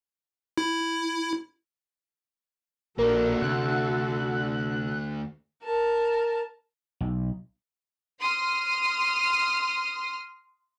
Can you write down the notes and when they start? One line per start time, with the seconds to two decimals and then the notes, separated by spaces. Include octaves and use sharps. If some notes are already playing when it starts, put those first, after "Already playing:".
0.58 E4
2.99 A#1 A#3 D4 F#4 A4 A#4
3.42 D2 C3 F#6
5.64 A#4 A5
7.01 B1
8.20 C6 D#6 F6